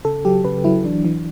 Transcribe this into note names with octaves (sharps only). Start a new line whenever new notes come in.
C#3 A4
F#3 G4
C#3 B4
F#3 E4
E3 D4
E3